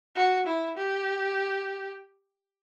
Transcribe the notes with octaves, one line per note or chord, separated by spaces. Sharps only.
F#4
E4
G4